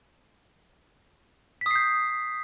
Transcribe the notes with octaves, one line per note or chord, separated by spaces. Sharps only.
D#6 G6 B6 C7